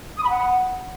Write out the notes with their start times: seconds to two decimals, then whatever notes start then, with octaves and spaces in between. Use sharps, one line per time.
0.17 D#6
0.23 B5
0.29 F#5